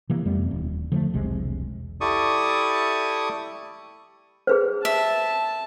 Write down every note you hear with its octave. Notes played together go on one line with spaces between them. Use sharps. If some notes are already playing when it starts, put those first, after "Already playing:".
C3 E3 A#3
F2 G3 A3 B3
D#1
D3 F3 G#3 A3
E1 B1 C3 G#3
E4 G4 A4 D5 C#6 D#6
G#4 B4 C5
E5 A5